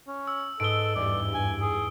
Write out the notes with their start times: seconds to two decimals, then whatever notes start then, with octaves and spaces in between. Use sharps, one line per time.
0.08 C#4
0.27 E6
0.60 G#2 A4 B4 D#6 D7 G7
0.96 E2 G2 D5
1.34 G#5
1.61 G#4